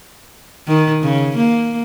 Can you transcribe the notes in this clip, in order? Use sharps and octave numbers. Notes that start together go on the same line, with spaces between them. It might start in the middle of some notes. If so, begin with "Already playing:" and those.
D#3
C#3
A#3